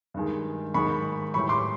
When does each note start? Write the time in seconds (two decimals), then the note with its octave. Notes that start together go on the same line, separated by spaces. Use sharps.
0.14 G2 D#3 G#3
0.74 G#2 D#3 G#3 B5 C#6
1.34 A2 E3 G3 B5 C#6
1.49 C6 D6